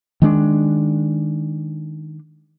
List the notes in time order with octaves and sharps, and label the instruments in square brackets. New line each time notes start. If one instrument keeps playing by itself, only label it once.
[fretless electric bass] D#3 G#3 D4